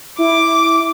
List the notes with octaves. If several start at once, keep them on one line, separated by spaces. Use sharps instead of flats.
E4 D6